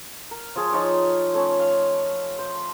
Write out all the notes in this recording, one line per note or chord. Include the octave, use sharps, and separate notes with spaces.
A#4
F3 F4 G#4 C#5
F3 D#4 C#5 D5
A3 C#4
F5
C5